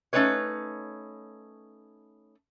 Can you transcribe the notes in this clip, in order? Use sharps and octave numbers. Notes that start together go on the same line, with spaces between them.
A3 C#4 D#4 B4 C#5